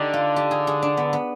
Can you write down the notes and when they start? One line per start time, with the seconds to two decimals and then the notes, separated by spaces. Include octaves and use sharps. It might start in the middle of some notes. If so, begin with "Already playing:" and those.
Already playing: D3 C4 D#4 G4
0.13 F4
0.36 G4
0.51 G#4
0.67 G#4
0.82 D4
0.97 B3
1.13 B3